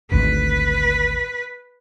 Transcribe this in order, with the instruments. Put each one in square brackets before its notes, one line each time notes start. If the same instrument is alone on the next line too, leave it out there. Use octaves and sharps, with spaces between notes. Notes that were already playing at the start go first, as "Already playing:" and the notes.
[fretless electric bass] G#1 D2 [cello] B4